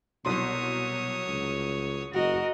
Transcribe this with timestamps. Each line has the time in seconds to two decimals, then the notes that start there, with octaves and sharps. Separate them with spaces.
0.25 C2 B2 F#3 C#5 C6 D#6
1.28 C#2
2.13 F#1 F#4 A#4 D#5